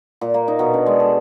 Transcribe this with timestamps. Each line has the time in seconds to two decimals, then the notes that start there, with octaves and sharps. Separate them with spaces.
0.21 A#2
0.34 A#3
0.48 D#4
0.59 B2
0.74 D4
0.86 G#3
1.00 A4